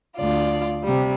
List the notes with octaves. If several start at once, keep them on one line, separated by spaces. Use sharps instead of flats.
D2 F4 D5
C3 G3